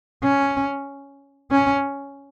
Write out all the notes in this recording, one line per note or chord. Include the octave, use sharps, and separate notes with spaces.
C#4
C#4